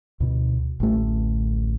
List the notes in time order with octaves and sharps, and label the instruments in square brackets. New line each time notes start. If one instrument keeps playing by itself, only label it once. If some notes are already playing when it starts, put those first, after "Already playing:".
[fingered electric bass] D2 B2
A1 D2 A3